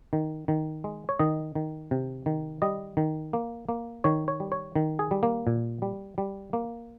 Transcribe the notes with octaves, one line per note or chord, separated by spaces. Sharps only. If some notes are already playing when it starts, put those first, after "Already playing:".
D#3
D#3
G#3
C#5
D#3 D#5
D#3
C3
D#3
G3 D#5
D#3
A#3
A#3
D#3 C#5
C#5
G3
C#5
D#3
G#4
G3
A#3
A#2
G3
G3
A#3